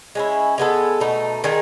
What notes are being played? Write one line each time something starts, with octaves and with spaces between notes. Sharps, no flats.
G#3 C#4 E4
G#3 B3 E4 A4
B2 A3 D#4
D#3 G#3 D#4 G#4